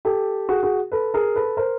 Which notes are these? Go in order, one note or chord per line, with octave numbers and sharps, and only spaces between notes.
G4 A4
F#4 G#4
F#4 G#4
A4 B4
G#4 A#4
A4 B4
A#4 C5